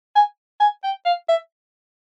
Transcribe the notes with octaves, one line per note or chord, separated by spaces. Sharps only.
G#5
G#5
G5
F5
E5